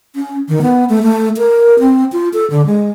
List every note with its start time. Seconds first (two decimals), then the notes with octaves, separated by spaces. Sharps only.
0.16 C#4
0.49 D#3
0.62 B3
0.89 A3
1.03 A3
1.37 A#4
1.79 C4
2.12 F4
2.33 A4
2.50 D3
2.66 G#3